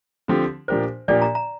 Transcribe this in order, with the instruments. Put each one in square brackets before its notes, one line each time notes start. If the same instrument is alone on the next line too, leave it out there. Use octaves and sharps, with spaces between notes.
[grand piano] D3 F3 C4 G4
[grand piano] A#2 F3 D4 G4 A#4 [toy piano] C5
[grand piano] A#2 F3 D4 G4 A#4 [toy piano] D5
[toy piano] A#5
A#5